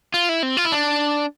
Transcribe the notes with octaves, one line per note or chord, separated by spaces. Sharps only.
F4
E4
C4
F4
E4
D4